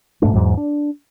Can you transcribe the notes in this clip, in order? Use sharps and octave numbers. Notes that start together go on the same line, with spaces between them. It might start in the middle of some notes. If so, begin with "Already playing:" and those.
G#2 B2 A3 D4
E2 G#2 F#3
D4